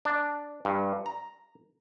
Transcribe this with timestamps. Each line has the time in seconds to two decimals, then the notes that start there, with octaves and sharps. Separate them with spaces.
0.05 D4
0.65 G2
1.06 A#5